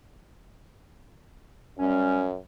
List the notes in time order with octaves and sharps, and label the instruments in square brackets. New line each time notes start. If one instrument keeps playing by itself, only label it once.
[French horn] F#2 [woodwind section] G3 C#4